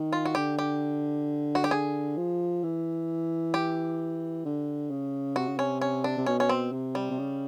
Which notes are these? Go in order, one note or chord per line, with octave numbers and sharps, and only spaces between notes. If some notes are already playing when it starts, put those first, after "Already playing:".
Already playing: D#3
F4
F#4
D3 G4
G4
F#4
G4
D3 G#4
F3
E3
G4
D3
C#3
C3 F#4
C#3
C3 C#4
C#4
D4
C3
B2 C#4
C#4
C4
C3
G3
C3
C#3